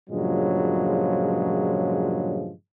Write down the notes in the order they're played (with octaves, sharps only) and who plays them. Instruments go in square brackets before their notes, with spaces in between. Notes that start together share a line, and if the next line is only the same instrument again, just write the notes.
[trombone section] G2 A#2 C#3 F3 F#3 G#3